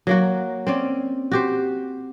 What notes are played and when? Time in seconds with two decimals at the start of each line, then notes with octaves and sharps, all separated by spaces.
0.07 F#3 A#3 F#4
0.67 C4 C#4 D5
1.31 F#4 G4 C5